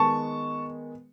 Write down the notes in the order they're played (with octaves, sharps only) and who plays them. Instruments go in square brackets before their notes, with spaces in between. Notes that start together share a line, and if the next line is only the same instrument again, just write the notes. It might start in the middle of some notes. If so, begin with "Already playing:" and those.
Already playing: [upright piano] D#3 G#3 B3 A5 C#6